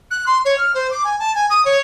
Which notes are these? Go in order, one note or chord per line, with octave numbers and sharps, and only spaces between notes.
F#6
C6
C#5
F6
C5
D6
G#5
A5
G#5
D#6
C#5